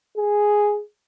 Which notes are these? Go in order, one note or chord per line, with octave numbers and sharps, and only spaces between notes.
G#4